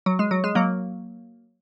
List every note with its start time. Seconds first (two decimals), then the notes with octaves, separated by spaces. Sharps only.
0.06 F#3
0.19 G#3
0.31 F#3
0.44 G#3
0.55 F#3 A#3